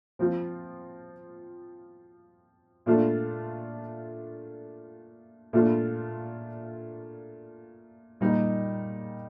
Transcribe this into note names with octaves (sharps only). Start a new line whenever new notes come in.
F3 C4 F4
A#2 A3 D4 F4
A#2 A3 D4 F4
A#2 G3 A#3 D#4